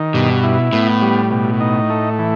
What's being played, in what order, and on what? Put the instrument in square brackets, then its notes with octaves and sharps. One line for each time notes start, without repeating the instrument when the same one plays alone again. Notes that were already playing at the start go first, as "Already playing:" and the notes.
Already playing: [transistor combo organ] D#3
[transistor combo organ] G2 [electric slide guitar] B2
[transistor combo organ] E4
[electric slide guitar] A2 [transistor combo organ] B3
[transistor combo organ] G3
B2
D#4
A3
E3